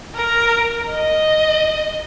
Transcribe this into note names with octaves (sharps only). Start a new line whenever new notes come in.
A#4
D#5